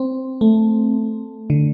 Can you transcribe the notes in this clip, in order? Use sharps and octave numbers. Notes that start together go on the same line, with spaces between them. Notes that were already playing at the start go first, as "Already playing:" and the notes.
Already playing: C4
A3
D3